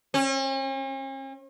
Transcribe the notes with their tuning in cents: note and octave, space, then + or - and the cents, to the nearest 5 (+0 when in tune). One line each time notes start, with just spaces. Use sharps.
C#4 -45